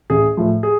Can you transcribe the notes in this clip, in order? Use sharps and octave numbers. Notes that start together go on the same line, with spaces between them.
A1 G#4
A2 F3
G#4